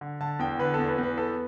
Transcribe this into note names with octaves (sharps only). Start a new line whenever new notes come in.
D3
D3 A5
E2 G5
D3 B4
E2 A4
B4
E2
B4
B3 A4